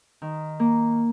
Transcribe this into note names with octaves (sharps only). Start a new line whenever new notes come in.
D#3
A#3